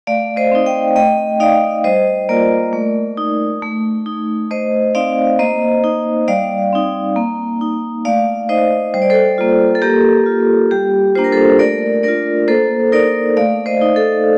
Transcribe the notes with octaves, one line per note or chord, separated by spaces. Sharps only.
A3 D5 F5
C5 D#5
C4 D#4
D#5 G5
A3 D#5 G5
D#4 D5 F5
G3 C5 D#5
A#3 F4 A#4 D5
A3
D#4
A3
D#4
A3 C5 D#5
C4 D#4 D5 F5
A#3 C5 D#5
D#4
G3 D5 F5
C4 D#4
A#3
D#4
A3 D5 F5
D#4 C5 D#5
G3 C5
D5
A4 C5
A#3 F4
A4
A#3 G4 A#4
F4
G3 G4
A#3 D4 F4 C5
A#4
A4 C5
A3 A#4 D5
D4 F4 A#4 D5
A#3 A4 C5
D#4 A#4 D5
A3 D5 F5
C5 D#5
D#4
A4